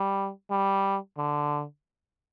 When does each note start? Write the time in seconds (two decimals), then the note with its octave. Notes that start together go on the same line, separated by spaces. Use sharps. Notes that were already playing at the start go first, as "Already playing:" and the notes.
Already playing: G3
0.50 G3
1.18 D3